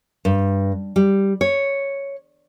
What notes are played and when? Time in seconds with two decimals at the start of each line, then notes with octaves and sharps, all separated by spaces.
0.25 G2
0.96 G3
1.41 C#5